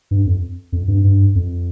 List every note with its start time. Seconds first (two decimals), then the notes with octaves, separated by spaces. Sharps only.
0.11 G2
0.26 F2
0.72 F2
0.88 G2
1.04 G2
1.35 F2